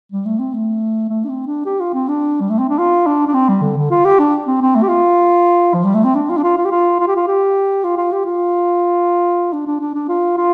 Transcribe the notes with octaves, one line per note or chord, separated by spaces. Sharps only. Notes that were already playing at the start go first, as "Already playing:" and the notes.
G3
A3
C4
A3
A3
D4
C4
D4
G4
F4
C4
D4
G3
A3
C4
D4
F4
D4
D4
C4
G3
D3
D3
F4
G4
D4
C4
C4
A3
G4
F4
F3
G3
A3
C4
D4
F4
D4
F4
F4
G4
F4
F4
G4
F4
G4
F4
F4
G4
F4
D4
D4
D4
D4
F4
F4